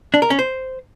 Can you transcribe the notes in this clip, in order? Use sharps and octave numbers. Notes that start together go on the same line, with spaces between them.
D4
A#4
C#4
C5